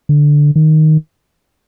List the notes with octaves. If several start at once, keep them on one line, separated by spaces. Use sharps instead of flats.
D3
D#3